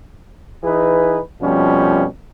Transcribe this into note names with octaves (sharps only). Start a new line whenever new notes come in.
E3 D#4 G#4 B4
F2 B2 F3 G3 C#4